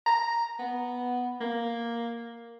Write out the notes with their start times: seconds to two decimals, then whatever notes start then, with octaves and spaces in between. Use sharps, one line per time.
0.06 A#5
0.59 B3
1.41 A#3